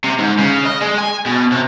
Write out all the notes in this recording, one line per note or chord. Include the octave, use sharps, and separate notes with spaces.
C3
G#2
C#3
D#5
G#3
G#5
B2
C3